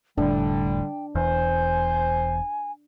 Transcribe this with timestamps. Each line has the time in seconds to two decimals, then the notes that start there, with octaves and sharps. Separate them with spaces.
0.18 F1 A2 D3 G3 D4 G5
1.15 E1 E2 C5 G#5